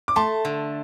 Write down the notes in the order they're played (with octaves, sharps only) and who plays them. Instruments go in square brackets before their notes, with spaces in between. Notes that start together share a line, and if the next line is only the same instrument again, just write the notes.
[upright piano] D6
[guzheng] A3 [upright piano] A5 C6
[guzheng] D3